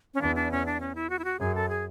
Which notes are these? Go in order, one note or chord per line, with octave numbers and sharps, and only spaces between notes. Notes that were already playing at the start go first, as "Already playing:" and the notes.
C#4
E2 D4
D4
C#4
D4
C#4
E4
F#4
E4
F#4
F#2 G#4
A4
G#4